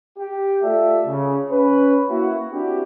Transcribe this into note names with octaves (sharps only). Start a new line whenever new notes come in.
G4
A3 F4 A4 D5 E5
C#3
C#4 B4
A#3 E4 F#4
C4 D4 E4 F#4 G4